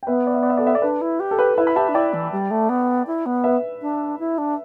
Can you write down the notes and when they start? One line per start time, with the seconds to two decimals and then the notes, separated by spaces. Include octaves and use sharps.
0.03 G5
0.07 B3 B4 E5
0.27 D5
0.34 E5
0.43 D5
0.50 E5
0.57 A4 D5
0.67 E5
0.75 D5
0.82 D4 B4
1.01 E4
1.20 G4
1.31 A4
1.39 B4
1.57 E4 B4 E5
1.67 B5
1.76 G4 E5 A5
1.89 D4
1.94 E4 D5 G5
2.13 E3
2.32 G3
2.51 A3
2.69 B3
3.07 E4
3.26 B3
3.44 B4 E5
3.82 D4
4.19 E4
4.38 D4